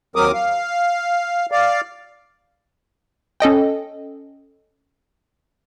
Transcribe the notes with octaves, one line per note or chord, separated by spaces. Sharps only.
D#2 F#3 C4 A#4 D6 D#6
F5
D5 F5
C#4 A4 D#5 G5